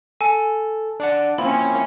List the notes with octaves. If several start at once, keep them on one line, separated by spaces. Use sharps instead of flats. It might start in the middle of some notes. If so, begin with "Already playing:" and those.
A4 G#5
D4 D5 F#5
A#3 C4 C#4 E4 F4 B5